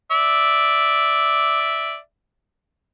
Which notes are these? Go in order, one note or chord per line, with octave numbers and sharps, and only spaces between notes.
D5 E5